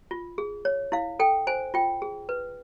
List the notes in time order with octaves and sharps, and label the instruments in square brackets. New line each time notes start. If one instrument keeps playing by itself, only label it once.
[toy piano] F4
G#4
C#5
E4 F5
A4 G5
C5 G#5
F4 G5
G#4
B4